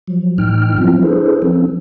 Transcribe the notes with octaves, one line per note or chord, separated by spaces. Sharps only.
F3 F#3
A2 E3 D#4 G5 F6
F3 F#3 B3 C4 E4 F4
D4 E4 G#4 A4 B4 C5
F3 C4 C#4 A4